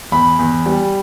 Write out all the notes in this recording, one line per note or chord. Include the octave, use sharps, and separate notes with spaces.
E2 B5
E2
G3